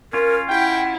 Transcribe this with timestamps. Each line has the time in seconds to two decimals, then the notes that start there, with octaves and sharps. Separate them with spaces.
0.13 C#4 F4 A#4
0.49 E4 F#5 G5